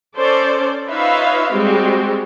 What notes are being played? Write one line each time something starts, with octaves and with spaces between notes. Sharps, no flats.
C#4 A4 C5 D5
D#4 F4 B4 C#5 E5 F5
G3 G#3 C4 F#4 G4